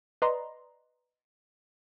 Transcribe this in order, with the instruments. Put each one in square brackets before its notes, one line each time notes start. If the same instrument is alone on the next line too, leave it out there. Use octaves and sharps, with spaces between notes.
[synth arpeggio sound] B4 D5 D#5 A#5 C6